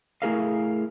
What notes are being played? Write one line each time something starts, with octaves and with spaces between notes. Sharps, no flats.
A3 E4 G#4 A#4 D#5 F5